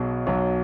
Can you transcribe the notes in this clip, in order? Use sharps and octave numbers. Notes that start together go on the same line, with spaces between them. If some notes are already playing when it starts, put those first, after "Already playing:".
Already playing: B1 B2 F#3 G#4
B1 B2 F#3